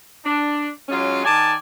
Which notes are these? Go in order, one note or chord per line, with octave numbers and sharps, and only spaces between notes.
D4
F#3 G#3 C#4 F4
D#3 D5 G#5 A5